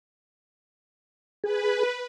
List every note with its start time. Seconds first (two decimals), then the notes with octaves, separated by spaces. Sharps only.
1.44 G#4 B4